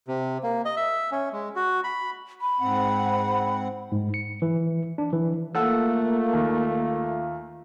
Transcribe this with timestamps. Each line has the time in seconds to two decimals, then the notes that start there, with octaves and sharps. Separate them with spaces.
0.08 C3
0.43 A#3
0.65 D#5
0.77 E5
1.12 C#4
1.33 G#3
1.56 F#4
1.84 B5
2.41 B5
2.60 G#2 C4 F#5
3.92 G#2
4.14 C#7
4.42 E3
4.98 D4
5.13 E3
5.55 A3 A#3 F4 A4 F#5 E6
6.33 D#2